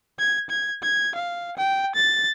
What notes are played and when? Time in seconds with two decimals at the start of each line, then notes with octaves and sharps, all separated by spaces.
0.19 G#6
0.50 G#6
0.82 G#6
1.15 F5
1.57 G5
1.95 A6